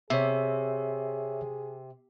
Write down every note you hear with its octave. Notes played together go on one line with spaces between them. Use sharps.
C3 G#4 C#5 E5